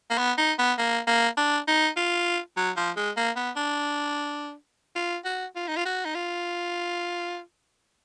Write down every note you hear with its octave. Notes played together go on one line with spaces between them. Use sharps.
A#3
B3
D#4
B3
A#3
A#3
D4
D#4
F4
F#3
F3
G#3
A#3
B3
D4
F4
F#4
F4
D#4
F4
F#4
D#4
F4